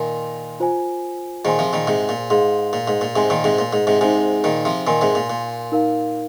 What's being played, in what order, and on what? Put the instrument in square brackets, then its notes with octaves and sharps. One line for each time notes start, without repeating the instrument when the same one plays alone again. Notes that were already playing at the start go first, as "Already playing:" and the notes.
Already playing: [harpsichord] A#2 D#3 [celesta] A#4 G#5 C6
[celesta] F4 C5 G#5
[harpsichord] A#2 D#3 [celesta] G#4 C5 G#5 C6
[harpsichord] C3 F3
A#2 D#3
G#2 C3
A#2
[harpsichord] G#2 [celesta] G#4 F5 C6
[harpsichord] A#2
G#2
A#2
[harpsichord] G#2 C3 [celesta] C5 G#5 C6
[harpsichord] A#2 D#3
G#2 C3
A#2
G#2
G#2 C3
[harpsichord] G#2 C3 [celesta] D#4 G#4 C5 G#5
[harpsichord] A#2 D#3
C3 F3
[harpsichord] A#2 D#3 [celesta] A#4 G#5 C6
[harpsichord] G#2 C3
A#2
A#2
[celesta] D#4 A#4 F5